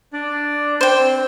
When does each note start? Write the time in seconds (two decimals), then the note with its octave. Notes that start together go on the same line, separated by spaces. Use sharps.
0.13 D4 D5
0.81 C5 G5
1.00 C4